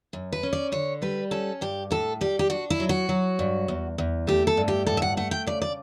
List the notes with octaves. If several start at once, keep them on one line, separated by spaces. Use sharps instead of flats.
F#2
B4
C#4
D5
D3 C#5
G3 B4
C#4 A4
G2 G4
A2 A4
G3 G4
G4
D4 F#4
E4
F#3
F#4
F#3
G2
E2
E2
A3 G4
A4
G2
G4
A2 A4
E5
F#5
A3 F#5
G5
C#3 D5
D5